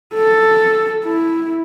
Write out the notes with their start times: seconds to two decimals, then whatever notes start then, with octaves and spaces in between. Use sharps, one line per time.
0.15 A4
1.05 E4